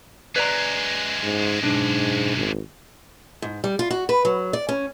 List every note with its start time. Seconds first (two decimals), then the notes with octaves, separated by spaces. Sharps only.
0.36 F#2 G#3 B4 D5 A#5
1.23 G#2
1.63 B1 G#2 D4
2.36 G#1
3.42 G#2
3.64 G3
3.79 F4
3.91 F#4
4.09 B4
4.25 F#3
4.53 D5
4.69 C#4